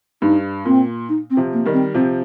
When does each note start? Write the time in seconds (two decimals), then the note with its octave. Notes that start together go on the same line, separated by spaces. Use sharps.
0.22 G2 D#4
0.65 A#2 C4
1.09 D#4
1.30 C4
1.37 C3 F3
1.52 A#3
1.66 D#3 G3
1.73 C4
1.95 C3 F3 C4